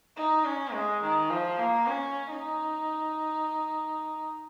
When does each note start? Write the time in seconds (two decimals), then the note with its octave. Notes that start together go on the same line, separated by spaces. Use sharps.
0.17 D#4
0.45 C#4
0.73 G#3
1.02 D#3
1.30 F3
1.58 A#3
1.87 C#4
2.30 D#4